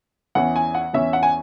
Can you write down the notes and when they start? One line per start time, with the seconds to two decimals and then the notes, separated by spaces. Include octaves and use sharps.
0.35 E2 E3 C#4 F#5
0.56 G#5
0.75 F#5
0.93 E2 E3 C#4 E5
1.13 F#5
1.23 G#5